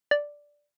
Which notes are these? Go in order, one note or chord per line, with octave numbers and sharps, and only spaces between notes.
D5